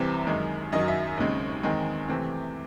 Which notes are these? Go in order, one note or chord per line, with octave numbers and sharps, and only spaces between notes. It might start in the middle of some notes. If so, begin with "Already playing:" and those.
Already playing: C2 C3 E3 C4
F#2 D#3 G#3
F#2 D#3 F#3 D#5
E5
D#2 C#3 G#3 C4
E2 D#3 G#3 C4
C3 E3 A3 C4